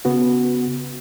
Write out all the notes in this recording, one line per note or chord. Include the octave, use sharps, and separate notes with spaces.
C#3 B3 F#4